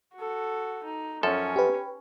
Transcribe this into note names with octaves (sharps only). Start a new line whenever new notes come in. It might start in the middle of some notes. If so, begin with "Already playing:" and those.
F#4 A4
D#4
F#2 F3 C#4 A4
G4 B4